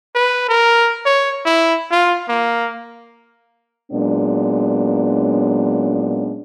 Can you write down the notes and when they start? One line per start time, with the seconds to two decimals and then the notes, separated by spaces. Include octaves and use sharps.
0.15 B4
0.49 A#4
1.06 C#5
1.46 E4
1.91 F4
2.28 A#3
3.92 A#2 F#3 G#3 B3 C#4 D4